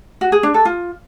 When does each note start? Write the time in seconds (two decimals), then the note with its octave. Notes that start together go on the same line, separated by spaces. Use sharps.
0.21 F#4
0.32 G#4
0.43 D4
0.54 A4
0.65 F4